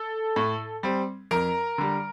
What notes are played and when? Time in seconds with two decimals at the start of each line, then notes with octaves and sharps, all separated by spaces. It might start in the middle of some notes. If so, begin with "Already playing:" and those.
Already playing: A4
0.36 A2
0.83 G3 C4
1.31 F2 A#4 A#5
1.78 D3 G3